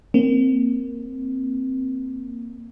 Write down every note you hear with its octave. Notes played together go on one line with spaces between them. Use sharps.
A#3 C4